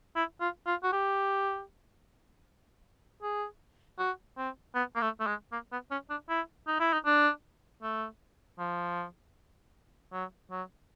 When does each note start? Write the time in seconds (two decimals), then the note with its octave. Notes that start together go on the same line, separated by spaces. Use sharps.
0.16 E4
0.41 F4
0.67 F4
0.83 F#4
0.92 G4
3.22 G#4
3.99 F#4
4.38 C4
4.75 B3
4.96 A#3
5.02 A3
5.20 A3
5.27 G#3
5.52 A#3
5.72 B3
5.91 C#4
6.10 D4
6.29 E4
6.68 D#4
6.80 E4
6.93 D#4
7.06 D4
7.82 A3
8.59 F3
10.12 F#3
10.51 F#3